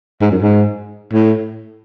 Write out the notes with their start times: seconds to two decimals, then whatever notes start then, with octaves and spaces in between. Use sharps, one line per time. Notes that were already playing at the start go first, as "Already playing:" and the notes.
0.21 G#2
0.31 F#2
0.42 G#2
1.13 A2